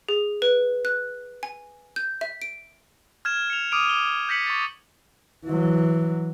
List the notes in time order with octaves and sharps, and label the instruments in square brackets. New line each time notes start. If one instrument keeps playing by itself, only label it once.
[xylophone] G#4
B4
F#6
G#5
G6
E5
D7
[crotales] F6 G#6 E7
C#7 F7
D6 D#6 F6 D7 D#7 F7
D6 F6 E7 G7
G6 A#6 B6 C#7 F#7
C#6 A6
[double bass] E3 F#3